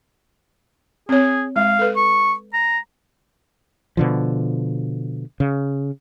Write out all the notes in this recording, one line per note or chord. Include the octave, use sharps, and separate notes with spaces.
C4 G#4 C#5
G#3 F5
A4 B4
C#6
A#5
B2 D3 F3
C#3